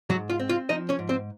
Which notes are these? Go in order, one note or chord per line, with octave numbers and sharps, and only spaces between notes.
G#2 F#3 F#4
F4
C4
F4
F3 D#4 D#5
C#4 C#5
G#2
C4 C5